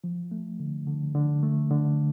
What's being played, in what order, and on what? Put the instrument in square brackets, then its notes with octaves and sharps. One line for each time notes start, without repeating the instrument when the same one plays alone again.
[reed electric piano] F3
A3
D3
D3
D3
A3
D3